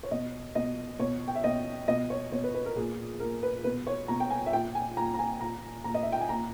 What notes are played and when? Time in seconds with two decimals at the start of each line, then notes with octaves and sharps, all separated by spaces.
0.03 C#5
0.11 B2 D#5
0.55 B2 D#5
0.99 B2 C#5
1.28 G5
1.35 E5
1.44 B2 D#5
1.88 B2 D#5
2.10 C#5
2.32 B2 C#5
2.44 B4
2.54 B4
2.66 A#4
2.76 A#2 G#4
3.20 A#2 A#4
3.43 B4
3.64 B2 B4
3.87 C#5
4.08 B2 A#5
4.20 G5
4.30 G#5
4.46 E5
4.53 A#2 G5
4.75 G#5
4.97 A#2 A#5
5.14 A#5
5.19 G#5
5.41 A#2 A#5
5.84 A#2 A#5
5.94 D#5
6.03 E5
6.12 G5
6.21 G#5
6.29 A#2 A#5